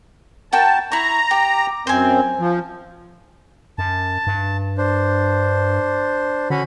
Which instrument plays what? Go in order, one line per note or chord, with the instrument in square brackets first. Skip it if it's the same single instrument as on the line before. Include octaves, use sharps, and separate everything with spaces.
[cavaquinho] F#4 A#4 G5 [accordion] A5
[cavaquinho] E4 C#6 [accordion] A#5
[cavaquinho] G4
[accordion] F#2 C4 [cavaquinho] C5 G#5
[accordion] F3
[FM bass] F#2 [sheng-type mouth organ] A5
[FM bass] G2
[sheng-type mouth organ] D4 C5
[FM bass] D3 [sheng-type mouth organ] C#4 F#4 B5